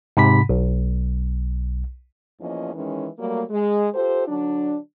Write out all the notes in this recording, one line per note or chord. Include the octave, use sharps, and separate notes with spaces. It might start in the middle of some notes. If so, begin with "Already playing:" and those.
G#2 C3 B5 B6
B1
E2 F3 A#3 C#4 D#5
D#3 E3 G#3 C#4
F#3 G3 A3 A#3
G#3
F4 G4 A4 C5
D3 F#3 D4